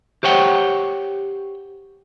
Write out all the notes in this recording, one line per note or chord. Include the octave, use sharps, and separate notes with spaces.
G4 C5 C#5 F#5 G5